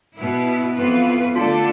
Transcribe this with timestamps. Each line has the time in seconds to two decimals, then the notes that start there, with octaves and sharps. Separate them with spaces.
0.16 B2 B3 E4
0.75 F2 E3 B3 F4 B4
1.35 D3 A3 D4 F4 A4